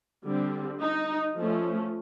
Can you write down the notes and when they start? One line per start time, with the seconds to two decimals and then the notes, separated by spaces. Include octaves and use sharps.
0.26 D3 G3 C4
0.82 D#4
1.38 F3 A3 C#4